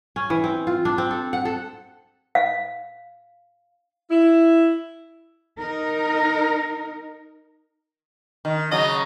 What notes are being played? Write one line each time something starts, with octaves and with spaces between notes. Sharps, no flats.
C#4
E3
C4
F4
D4
C4
A4
F#5
A4
F5
E4
D#4 A#4
D#3
C#3 F#3 D#5